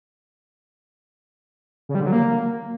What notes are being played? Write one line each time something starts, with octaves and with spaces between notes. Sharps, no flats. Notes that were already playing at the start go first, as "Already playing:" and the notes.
C#3
G3
D3
F#3
A#3